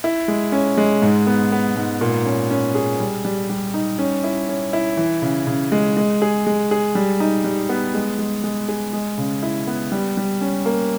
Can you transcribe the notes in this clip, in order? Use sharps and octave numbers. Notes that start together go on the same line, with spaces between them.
E4
G#3
C#4
G#3
G#2
B3
B3
G#2
A#2
C#4
C#4
G#4
G3
G3
G3
D#4
C#4
E4
C#4
E4
E3
C#3
C#3
G#3
G#3
G#4
G#3
G#4
G3
D#4
G3
B3
G#3
G#3
G#3
G#4
G#3
C#3
E4
B3
G3
G3
C#4
A#3